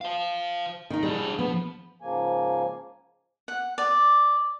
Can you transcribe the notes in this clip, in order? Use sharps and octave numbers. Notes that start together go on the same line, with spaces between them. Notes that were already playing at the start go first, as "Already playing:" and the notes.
C5 F5
D#3 D#4
G3 D4 G#4
F3 B3
G#2 C#3 F3 A#3 G#5
F#5
D5